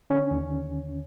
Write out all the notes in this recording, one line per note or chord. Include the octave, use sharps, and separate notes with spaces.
D3 C#4
D#2